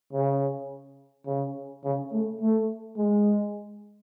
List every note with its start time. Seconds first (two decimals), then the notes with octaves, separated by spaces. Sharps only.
0.13 C#3
1.26 C#3
1.84 C#3
2.12 A3
2.41 A3
2.97 G#3